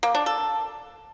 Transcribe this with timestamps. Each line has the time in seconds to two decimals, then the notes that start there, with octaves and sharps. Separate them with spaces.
0.03 A#3
0.15 D4
0.26 A4